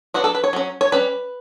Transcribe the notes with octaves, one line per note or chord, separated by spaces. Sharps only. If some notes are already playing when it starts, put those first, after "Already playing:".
F#3 B3 D4 F#4
A4
B4
C#5
F#3 C#4
C#5
G3 C#4 B4